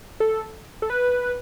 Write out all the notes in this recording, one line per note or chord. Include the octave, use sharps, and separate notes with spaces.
A4
A4
B4